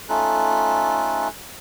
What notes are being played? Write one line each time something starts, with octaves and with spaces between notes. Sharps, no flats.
A3 C#4 D#4 F4 A4 F#6